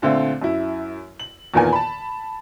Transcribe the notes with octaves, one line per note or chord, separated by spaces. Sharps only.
A#2 D3 A3 C4 F4
F#2 E4
F#7
E2 A#2 D#3 A#3 B3 G#5
A5 B5